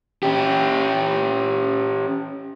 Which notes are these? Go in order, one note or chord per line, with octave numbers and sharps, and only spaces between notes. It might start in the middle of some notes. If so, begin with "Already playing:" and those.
C#4 G4